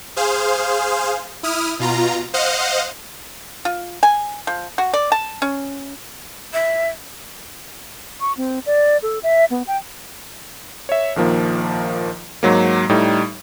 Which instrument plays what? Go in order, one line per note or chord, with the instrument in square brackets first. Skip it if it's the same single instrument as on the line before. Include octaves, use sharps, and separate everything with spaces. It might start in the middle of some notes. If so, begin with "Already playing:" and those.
[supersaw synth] G#4 C5 F5
E4 D#6 F6
B2 F4 A#5
C5 D#5 F5 F#5
[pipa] F4
G#5
F3
F#4
D5
A5
C#4
[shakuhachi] E5
[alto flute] C#6
C4
D5
A4
E5
B3
G5
[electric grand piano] C#5 E5
A#1 D#3 F3 A#3
G#2 F#3 A#3
A2 G3 D#4